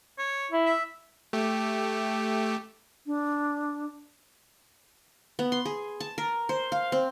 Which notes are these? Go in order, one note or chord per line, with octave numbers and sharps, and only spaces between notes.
C#5
E4
E5
A3 G4
D4
B3
C6
G#4
A5
A#4
C5
F5
C4